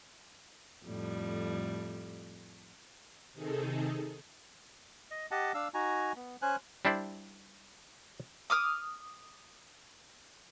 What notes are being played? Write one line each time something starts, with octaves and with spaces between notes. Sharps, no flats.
F2 A2 G3
C3 D#3 D#4 G#4 A4
D#5
G4 D#5 F#5 A5
D4 F5 E6
D#4 F#4 G#5 A#5
B3
C#4 C5 G#5 F#6
G3 D4 E4 C5 D5
D6 D#6 F6